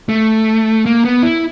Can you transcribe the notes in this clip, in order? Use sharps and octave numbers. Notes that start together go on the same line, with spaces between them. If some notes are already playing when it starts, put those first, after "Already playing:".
A3
A#3
B3
E4